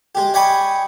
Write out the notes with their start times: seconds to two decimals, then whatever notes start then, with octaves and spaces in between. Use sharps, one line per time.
0.15 G#3 G4
0.34 D5 D#5 G5 G#5 B5 C#6